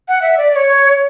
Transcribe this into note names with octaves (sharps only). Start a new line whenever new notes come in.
F#5
E5
D5
D5
C#5